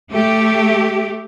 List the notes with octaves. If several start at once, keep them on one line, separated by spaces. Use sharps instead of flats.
A3 G4